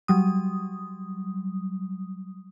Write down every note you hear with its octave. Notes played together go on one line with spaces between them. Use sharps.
F#3 G3 D#6